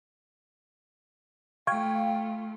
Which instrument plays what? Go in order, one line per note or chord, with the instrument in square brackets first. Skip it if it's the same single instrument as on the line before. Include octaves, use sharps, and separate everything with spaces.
[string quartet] A3 F4 [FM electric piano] F5 [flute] G5 [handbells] C#6 G#6